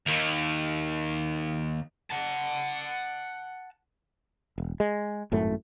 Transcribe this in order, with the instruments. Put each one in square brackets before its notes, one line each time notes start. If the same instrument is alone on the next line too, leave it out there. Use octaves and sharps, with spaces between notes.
[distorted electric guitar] D#2 D#3
F#5 A5
[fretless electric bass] E1
G#3
G#1 F#2 A2 A3